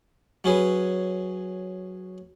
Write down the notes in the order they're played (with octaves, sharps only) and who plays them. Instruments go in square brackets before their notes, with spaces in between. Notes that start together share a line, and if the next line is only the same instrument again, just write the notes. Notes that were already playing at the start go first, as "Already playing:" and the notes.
[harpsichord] F#3 C#4 G#4 B4